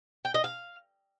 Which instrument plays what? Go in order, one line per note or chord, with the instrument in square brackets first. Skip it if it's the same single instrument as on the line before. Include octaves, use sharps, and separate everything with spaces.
[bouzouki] G5
D#5
F5